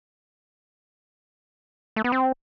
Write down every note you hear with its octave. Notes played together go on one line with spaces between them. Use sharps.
A3
B3
C4